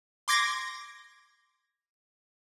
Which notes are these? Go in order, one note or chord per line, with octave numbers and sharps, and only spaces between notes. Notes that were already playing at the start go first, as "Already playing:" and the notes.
C6 D6 G#6 A#6